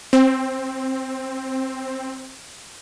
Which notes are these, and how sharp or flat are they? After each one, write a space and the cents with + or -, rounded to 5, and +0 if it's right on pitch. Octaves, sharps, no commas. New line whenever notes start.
C4 +10